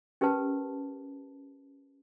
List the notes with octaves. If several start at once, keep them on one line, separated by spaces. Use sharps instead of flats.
C#4 G4 A#4 B4 A5